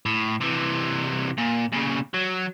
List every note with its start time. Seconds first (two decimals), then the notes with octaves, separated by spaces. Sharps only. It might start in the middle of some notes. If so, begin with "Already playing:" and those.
0.06 A2
0.41 C3 E3
1.38 A#2
1.73 A#2 C#3
2.14 F#3